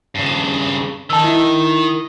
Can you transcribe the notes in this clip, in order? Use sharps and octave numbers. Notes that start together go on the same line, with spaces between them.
G2 C#3
D#3 A5 E6
E4